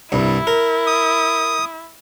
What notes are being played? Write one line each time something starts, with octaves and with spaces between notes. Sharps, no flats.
C2 G2 E4
A#4
D#6